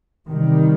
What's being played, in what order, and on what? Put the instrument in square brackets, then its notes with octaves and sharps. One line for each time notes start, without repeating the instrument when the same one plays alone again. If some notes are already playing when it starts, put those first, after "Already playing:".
[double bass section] C3 D#3 G3